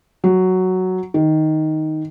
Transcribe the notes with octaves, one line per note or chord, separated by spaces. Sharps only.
F#3
D#3